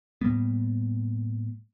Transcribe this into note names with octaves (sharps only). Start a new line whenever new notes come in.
A2 G3 A#3 B3